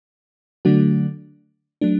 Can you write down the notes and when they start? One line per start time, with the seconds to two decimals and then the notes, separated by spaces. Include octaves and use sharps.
0.65 D3 F#3 A3 D4 F#4
1.81 F#3 A3 D4